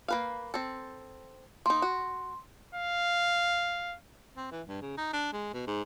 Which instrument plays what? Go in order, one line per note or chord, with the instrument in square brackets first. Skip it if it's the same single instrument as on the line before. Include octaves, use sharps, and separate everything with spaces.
[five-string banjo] A#3 B4 F5
C4 A4
[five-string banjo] A#3 D#4 [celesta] C6
[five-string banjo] F#4
[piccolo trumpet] F5
[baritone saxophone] C4
E3
G2
C#3
D#4
D4
G#3
B2
G#2